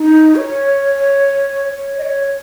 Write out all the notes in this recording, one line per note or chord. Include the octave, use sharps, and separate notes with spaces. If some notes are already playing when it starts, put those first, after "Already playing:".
Already playing: D#4
C#5
C#5
D#5
C#5